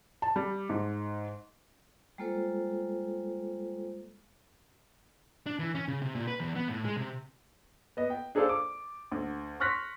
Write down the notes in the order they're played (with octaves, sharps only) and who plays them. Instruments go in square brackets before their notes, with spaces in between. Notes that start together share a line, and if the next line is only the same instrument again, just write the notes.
[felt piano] A5
G3
G#2
[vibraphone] G3 G#3 A#3 F4 A4 C5
[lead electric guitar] D4
E3
C#4
C#3
C3
A#2
B4
E2
B3
A2
G#3
C3
[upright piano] B3 D#5
G5
D4 G#4 A4 C5 D5 F5
D6
D2
C6 C#6 F6 F#6 A#6 B6